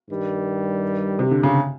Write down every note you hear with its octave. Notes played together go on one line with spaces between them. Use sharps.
G2 D#3 G3
C3
D3
C#3